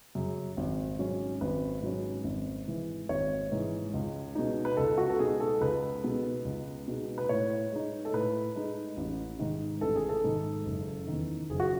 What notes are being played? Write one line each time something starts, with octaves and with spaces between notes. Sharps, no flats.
F#2 C#3
G#1
G#2 F#3 C#4
G#1 B4
G#2 F#3 C#4
G#1
G#2 E3
G#1 C#5
G#2 E3
C#2
B2 G#3 D#4
B4
C#2 A4
F#4
A4
B2 G#3 D#4 G#4
A4
C#2 B4
B2 G#3 B3 D#4
C#2
B2 G#3 B3 D#4
B4
A2 C#5
G#3 D#4
A4
A2 B4
G#3 D#4
A1
G#2 D#3
A1 A4
G#4
A4
G#2 D#3
F#1
E2 D#3
F#1 G#4
F#4